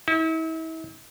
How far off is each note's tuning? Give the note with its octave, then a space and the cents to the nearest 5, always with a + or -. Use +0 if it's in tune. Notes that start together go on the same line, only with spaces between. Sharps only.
E4 -40